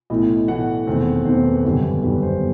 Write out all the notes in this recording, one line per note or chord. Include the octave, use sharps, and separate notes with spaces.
B1 A2 E3 A3 D#5
B1 A2 E3 A3 F#5
E1 E2 D#3 A3 C4
E1 E2 D#3 A3 C4 C5
B4
G1 F#2 D#3 G3 A4
B4
G1 F#2 D#3 G3 B4
C5